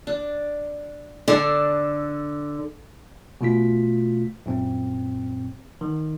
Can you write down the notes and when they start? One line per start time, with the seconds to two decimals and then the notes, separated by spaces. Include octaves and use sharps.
0.07 D4
1.28 D3 D4 A4
3.41 B2 A3 F4 B6
4.46 F#2 A#2 C4
5.81 D#3